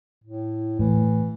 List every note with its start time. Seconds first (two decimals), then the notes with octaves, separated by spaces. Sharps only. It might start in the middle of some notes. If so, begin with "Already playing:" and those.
0.24 A2
0.79 A2 E3